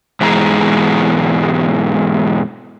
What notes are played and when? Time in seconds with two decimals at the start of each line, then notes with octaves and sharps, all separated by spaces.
0.21 G#2 B2 E3 G#3 A#5